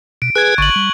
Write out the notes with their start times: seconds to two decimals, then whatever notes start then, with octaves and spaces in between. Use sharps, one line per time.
0.22 B2 D7
0.36 G#4 B4 G#5 F#6 G#6
0.58 G#1 D3 C#6 F#7
0.76 G3